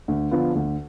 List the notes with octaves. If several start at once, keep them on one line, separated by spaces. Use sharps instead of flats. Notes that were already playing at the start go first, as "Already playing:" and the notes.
D2
D3 F3 B3 F4
D2